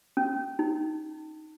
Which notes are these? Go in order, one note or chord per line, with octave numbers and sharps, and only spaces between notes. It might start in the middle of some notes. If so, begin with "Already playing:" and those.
C#4
D#4